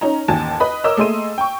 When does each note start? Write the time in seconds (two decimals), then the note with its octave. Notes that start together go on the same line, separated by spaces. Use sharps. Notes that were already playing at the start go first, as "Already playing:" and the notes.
0.01 C#4 D#4 A#5
0.28 A1 D#2 G#5 A5
0.60 B4 D#5 B5
0.84 A#4 C#5 D#5 D6 E6
0.97 A3 A#3 G#4 D#5 C6 D#7
1.38 G5 C#6